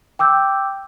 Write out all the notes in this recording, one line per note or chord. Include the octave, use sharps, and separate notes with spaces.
G5 D6 E6 G6